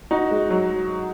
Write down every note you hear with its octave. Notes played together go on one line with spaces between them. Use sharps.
D#4 F#4
G#3
F#3